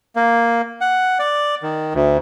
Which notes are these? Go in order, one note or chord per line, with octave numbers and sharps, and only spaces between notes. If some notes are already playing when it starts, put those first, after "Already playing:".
A#3
F#5
D5
D#3
D2